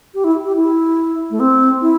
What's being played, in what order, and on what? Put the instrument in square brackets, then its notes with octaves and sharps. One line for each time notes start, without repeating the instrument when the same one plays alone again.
[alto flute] G4
E4
G4
E4
A3
C4
E4